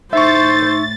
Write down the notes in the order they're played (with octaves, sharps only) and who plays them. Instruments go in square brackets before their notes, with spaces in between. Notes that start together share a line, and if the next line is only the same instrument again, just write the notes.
[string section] A2 A6 [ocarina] D#4 [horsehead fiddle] C5 [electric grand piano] E5 C#6